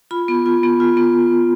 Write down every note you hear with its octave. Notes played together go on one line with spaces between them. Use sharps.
F4 B5
B3
F4
B3
F4
B3